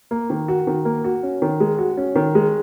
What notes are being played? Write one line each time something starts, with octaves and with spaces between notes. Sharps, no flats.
A#3
D#3
F#4
D#3
A#3
F#4
C#4
D#3
G#3
F#4
C#4
D#3
G#3